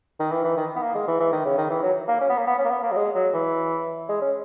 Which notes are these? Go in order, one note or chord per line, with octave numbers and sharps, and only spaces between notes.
D#3
E3
E3
D#3
B3
A#3
G#3
E3
E3
D#3
C#3
D#3
E3
F#3
A#3
C#4
B3
A#3
B3
C#4
A#3
B3
A#3
F#3
G#3
F#3
E3
G#3
C#4